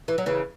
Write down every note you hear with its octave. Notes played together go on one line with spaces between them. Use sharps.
E3
F#3
C#3 E3